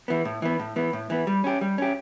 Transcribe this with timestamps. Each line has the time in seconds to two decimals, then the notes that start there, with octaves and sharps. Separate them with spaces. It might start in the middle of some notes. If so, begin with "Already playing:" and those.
0.08 E3 B3
0.25 A2
0.42 E3 B3
0.59 A2
0.76 E3 B3
0.93 A2
1.10 E3 B3
1.27 G3
1.44 C#4 G4
1.61 G3
1.78 C#4 G4